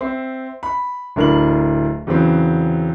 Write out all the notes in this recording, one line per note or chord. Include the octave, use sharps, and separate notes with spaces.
C4 E5
B5
D1 D4 A#4 B5 F#7
E2 C#3 F#3 C4